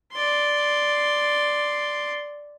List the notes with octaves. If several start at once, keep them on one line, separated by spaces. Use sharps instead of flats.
D5 C6